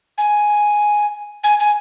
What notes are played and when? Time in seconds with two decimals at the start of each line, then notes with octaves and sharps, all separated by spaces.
0.18 G#5
1.44 G#5
1.60 G#5